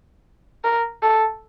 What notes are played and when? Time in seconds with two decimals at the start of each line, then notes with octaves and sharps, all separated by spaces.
0.64 A#4
1.03 A4